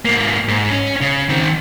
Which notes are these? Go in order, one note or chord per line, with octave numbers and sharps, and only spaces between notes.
G#2 A#3
G#2
C#4
C#3
D#3 C4